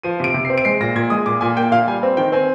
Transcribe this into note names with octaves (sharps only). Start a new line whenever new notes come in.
F3 D#7
C3 D7
C3
C7
C4
D7
G#3 C7
A#2 A#6
A#2 G#6
G#3 D#6
A#2 D6
A#2 G#5
A#3 G5
A#2 F5
G3 G#5
C4
D#3 G5
C4 G#5